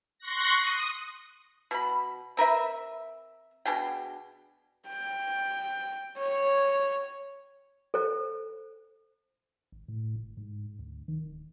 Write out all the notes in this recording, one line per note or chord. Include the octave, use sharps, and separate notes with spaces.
C6 C#6 F#6 A#6
D#6
B2 B5
C4 A#4 B4 E5
B2 D4 G#4 G5
G5
C#5
A4 C5
G#1
A2
G1
G#2
D2
D#3
D1